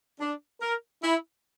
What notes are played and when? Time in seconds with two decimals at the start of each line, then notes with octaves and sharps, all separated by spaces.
0.20 D4
0.61 A#4
1.02 E4